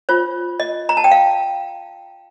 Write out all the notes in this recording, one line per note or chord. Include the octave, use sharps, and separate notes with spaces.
F4 C5
D#5
A#5
A5
G5
F5